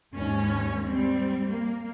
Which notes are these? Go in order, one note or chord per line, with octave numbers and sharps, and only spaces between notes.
D#2 G#2 C#4
G3 C4
A#3